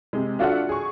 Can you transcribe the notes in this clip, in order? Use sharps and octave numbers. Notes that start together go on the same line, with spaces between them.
C3 G#3
D4 F4 F#4 A4 E5 F#5
G#4 C#6